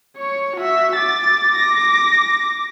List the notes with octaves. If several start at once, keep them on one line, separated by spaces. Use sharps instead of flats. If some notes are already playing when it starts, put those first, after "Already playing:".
C#5 C#6
F#4 E5
D6 A6
D6 A#6